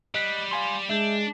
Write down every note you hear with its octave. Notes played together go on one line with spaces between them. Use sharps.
G3 D#5 F#6 B6
F5 G#5 C6
G#3 D4 E5 G6